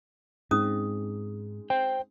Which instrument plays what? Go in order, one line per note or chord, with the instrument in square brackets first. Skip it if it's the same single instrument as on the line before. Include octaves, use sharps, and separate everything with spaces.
[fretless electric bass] G#2 [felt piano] G#3 C4 D#4 [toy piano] C#4 D#6
[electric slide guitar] C5 G5